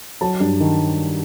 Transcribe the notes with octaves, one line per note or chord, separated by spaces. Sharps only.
F#3 A5
G2
D#3